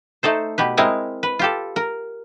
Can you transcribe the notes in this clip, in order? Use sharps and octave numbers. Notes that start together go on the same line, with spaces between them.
A3 D#4 A4 C5
B2 G4 B4
G#3 C4 E4 A#4 D#5
B4
F4 G4 A4
A#4